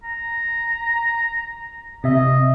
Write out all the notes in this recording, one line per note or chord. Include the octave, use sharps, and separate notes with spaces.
A#5
C3 D#5 E5